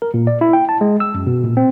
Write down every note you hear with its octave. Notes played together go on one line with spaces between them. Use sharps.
A#4
A#2
D5
E4
G5
A5
G#3
E6
F#2
B2
A#2
C4